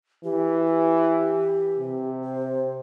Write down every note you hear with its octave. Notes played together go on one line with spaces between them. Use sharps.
E3 G4
G4
C3
C5